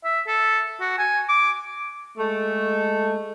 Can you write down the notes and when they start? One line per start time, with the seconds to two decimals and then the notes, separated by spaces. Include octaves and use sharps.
0.04 E5
0.27 A4
0.80 F#4
0.98 G#5
1.29 D6
2.17 G#3 A3